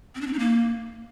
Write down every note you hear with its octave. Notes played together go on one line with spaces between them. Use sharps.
C4
D4
C4
D#4
A#3